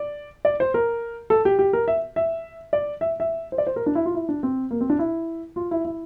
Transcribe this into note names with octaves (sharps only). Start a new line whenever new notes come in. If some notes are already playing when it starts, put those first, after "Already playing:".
Already playing: D5
D5
C5
A#4
A4
G4
G4
A#4
E5
E5
D5
E5
E5
C5
D5
C5
A#4
D4
E4
F4
E4
D4
C4
A#3
C4
D4
E4
F4
E4
E4